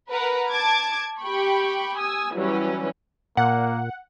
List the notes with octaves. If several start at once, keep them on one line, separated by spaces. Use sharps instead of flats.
A#4 B4 F#5
A5 D6 G#6 A6
G4 G5 B5 C#6
G#5 D#6 E6
E3 F#3 G3 C#4
A#2 A#3 F#5